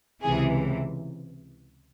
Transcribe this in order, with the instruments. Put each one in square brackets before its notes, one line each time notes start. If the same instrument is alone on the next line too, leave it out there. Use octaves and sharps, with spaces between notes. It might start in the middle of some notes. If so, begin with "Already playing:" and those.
[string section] C#2 C3 E3 G#4